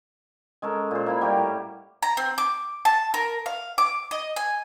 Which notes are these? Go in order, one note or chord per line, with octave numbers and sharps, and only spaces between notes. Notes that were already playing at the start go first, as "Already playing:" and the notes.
G#3 C#4 A4 A#4
A#2 C5
A#3 E4 B5
G3 F#4 G4 A#4
A2
A#5
C4
D6
A5
A#4
F5
D6
D#5
G#5